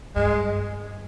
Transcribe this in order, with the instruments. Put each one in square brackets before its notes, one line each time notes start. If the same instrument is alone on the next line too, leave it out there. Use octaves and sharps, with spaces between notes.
[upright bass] G2 [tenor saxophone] G#3